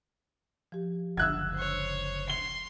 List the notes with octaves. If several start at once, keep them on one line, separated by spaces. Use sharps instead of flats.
F3 G4
F#1 C#2 D3 E6 F#6 G#6
C5 C#5
C6 G7